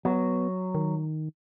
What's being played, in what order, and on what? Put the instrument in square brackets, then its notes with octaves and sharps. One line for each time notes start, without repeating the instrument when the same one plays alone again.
[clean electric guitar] F#3 [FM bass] B3
[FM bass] D#3